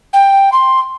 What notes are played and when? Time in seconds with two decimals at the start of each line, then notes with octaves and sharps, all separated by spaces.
0.13 G5
0.52 C6